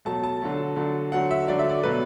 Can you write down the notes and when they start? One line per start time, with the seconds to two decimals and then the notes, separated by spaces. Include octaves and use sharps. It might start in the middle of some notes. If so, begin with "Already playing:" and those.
0.05 B2 F#3 A3 A5
0.23 A5
0.42 D3 F#3 A3
0.76 D3 F#3 A3
1.12 D3 F#3 A3 F#5
1.31 E5
1.48 D3 F#3 A3 D5
1.59 E5
1.69 D5
1.83 B2 F#3 A3 B4